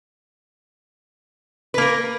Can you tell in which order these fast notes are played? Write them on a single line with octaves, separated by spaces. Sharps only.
B4 A#3 A#4